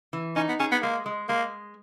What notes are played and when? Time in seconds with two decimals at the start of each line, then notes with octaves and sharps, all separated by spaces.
0.13 E3
0.36 C#4 D#4
0.49 B3
0.59 C#4 G#4
0.72 B3
0.82 G#3 A#3
1.06 G#3
1.29 G#3 A#3